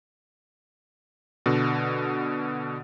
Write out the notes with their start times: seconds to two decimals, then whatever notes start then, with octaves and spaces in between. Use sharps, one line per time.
1.46 B2 D3